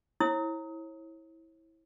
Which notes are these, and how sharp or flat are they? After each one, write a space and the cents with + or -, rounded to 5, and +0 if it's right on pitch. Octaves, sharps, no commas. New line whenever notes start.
E4 -15 C#5 -40 D#6 +30